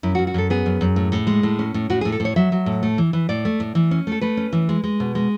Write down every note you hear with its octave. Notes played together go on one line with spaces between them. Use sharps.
F#2 E4
F#4
F#2
F#4
F#2 A4
B3 G#4
F#2
F#2
A2
A2
G#3
A2
C#4
A2
A2 F#4
G#4
A2
A4
A2
C#5
F#3 E5
F#3
A2
A3
E3
E3
A2 D5
A3
A2
E3
C#4
A3 A4
A3 B4
C#4
E3
G#3
G#3
B2
G#3